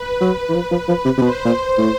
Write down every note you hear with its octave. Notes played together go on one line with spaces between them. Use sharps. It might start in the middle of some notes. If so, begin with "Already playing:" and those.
Already playing: B4
F#3
E3
F3
F3
F3
C3
C3
B2 C5
A#2
A2